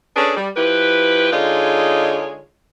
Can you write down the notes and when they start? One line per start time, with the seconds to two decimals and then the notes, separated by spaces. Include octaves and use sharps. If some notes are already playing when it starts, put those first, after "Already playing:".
0.16 C#4 D4 G#4 A4 B4 C#5
0.37 G3
0.57 F3 E4 G4 B4
1.32 D3 G#3 D#4 F4 G#4 C#5